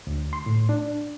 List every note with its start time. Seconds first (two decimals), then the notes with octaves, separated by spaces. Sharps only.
0.07 D2
0.33 C6
0.46 A2
0.69 D4